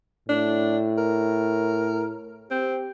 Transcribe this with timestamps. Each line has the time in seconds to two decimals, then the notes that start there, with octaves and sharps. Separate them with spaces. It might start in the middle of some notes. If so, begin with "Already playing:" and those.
0.29 A2 D4
0.98 A#4
2.51 C4 G4